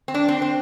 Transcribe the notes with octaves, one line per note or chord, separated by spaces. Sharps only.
C4
D4
C4
C4